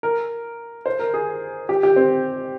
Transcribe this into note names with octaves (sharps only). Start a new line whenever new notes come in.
A#4
C5
A#4
G#4
G4
G4
C4